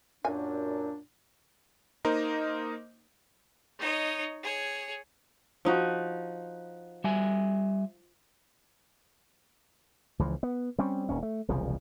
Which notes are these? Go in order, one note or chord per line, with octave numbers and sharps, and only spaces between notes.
F#2 A#2 D4 G#5
A#3 D#4 A#4 C5 D#5
D#4 C#5 D#5
G#4 C#5
F3 D#4 F#4
G3 E5 G#5
C#2 E3 F3
B3
G3 C4 C#4
D#1 D#2 C#4
A3
E1 C2 C#3 F3